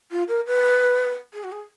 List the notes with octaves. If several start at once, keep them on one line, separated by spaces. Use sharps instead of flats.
F4
A#4
B4
G#4
F#4
G#4